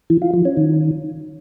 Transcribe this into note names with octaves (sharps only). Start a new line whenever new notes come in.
E3
F4
F3
C#4
D#3